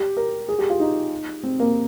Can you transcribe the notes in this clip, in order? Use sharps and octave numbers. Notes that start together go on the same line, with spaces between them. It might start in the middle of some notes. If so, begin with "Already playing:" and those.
Already playing: G4
A#4
G#4
G4
F4
D#4
C4
A#3